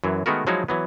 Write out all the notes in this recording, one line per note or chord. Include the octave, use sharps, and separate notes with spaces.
F#2 E3 F#3
D#3 G#3 A3 B3 F#4 A#4
F3 F#3 G#3 D#4 E4 F#4
E3 F#3 B3